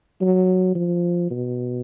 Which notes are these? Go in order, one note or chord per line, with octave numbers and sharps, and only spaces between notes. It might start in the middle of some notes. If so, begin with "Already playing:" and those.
F#3
F3
B2